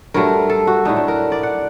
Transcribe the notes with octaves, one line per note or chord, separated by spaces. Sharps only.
G2 F#3 A3 A#4
A4
F#4
A2 A3 D4 D#4
D4
A#4
D5
F#5